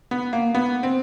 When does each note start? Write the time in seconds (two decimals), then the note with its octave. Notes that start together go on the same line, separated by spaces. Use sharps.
0.11 B3
0.33 A#3
0.55 B3
0.83 C4